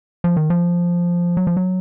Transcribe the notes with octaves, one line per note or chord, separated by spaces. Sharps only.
F3
D#3
F3
F#3
F3
F#3